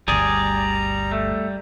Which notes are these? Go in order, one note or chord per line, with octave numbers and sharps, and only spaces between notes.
G1 D2 G3 G#4 D5 A#5
A3